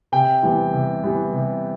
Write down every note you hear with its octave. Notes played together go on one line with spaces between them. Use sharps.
C3 G5
E3 G3 B3
C3
E3 G3 B3
C3